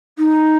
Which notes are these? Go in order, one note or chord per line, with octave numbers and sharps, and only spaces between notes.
D#4